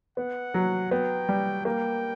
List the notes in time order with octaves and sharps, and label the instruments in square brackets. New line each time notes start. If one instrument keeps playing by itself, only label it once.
[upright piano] B3 [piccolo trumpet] F#5
[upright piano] F#3
[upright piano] B3 [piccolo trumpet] G5
[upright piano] G3
[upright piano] A#3 [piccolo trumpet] G5